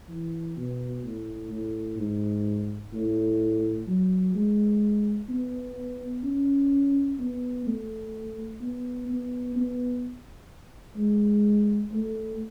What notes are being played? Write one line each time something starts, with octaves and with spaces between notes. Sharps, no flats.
E3
B2
A2
A2
G#2
A2
F#3
G#3
B3
C#4
B3
A3
B3
B3
B3
G#3
A3